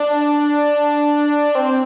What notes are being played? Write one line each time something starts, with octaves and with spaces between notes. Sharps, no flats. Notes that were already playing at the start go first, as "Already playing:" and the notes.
Already playing: D4
C4